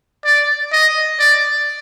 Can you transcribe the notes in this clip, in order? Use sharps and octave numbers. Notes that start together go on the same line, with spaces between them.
D5
D#5
D5